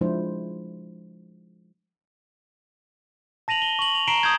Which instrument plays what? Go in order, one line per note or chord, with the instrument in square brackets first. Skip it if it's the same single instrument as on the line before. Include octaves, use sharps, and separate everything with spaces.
[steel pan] F3 G#3 D4 E4 C5
[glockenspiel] A5 A#6 D#7 F7 F#7
G7
C#6 F#7
F7
A#5 B6 C7 D7 E7 G7
D#6 G6 G#6